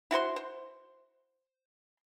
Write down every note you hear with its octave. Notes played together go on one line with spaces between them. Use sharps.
E4 F#4 C5 C6
C5